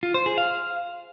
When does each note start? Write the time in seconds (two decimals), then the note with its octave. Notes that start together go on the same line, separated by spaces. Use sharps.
0.03 F4
0.14 C5
0.26 G#4
0.38 F5